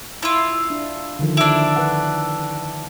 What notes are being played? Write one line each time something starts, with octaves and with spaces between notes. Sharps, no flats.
E4 F4
D4
D3 D#3 F3
D4 E4
B4 F#5